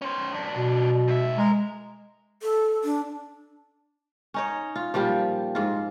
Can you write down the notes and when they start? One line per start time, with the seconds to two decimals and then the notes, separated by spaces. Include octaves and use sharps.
0.02 C#4 C5
0.34 F#2 D4
0.56 B2
1.08 G#2 E5
1.38 G#3 A#4
2.42 A4
2.84 D4
4.34 C#4 D#4 C#5
4.76 F4
4.94 A#2 F3 G3 G4
5.55 G#2 F4